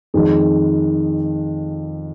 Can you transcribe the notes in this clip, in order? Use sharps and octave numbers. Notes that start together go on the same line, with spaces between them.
F2 D#3 G#3